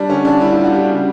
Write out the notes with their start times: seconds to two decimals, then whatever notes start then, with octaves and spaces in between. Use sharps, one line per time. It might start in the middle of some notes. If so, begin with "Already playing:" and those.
Already playing: G3 D4
0.09 D3 C#4
0.25 D3 D4
0.41 G3 E4
0.52 G3 F4
0.64 F#4
0.72 G3 G4
0.88 C#3